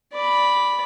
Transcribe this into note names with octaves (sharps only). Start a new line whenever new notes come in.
D5 B5